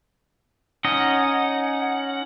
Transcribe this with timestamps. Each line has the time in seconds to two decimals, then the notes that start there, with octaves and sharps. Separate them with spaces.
0.85 C#4 D#4 D#5 F#5